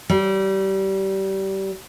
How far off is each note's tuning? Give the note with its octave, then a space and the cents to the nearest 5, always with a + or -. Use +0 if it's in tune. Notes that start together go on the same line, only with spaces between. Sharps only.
G3 -25